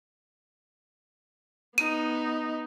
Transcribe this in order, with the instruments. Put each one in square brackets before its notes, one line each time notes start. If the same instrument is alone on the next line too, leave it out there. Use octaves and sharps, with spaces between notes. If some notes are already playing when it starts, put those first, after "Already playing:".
[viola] B3 D#4 [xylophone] D#7